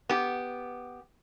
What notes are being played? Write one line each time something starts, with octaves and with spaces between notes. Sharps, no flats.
B3 G4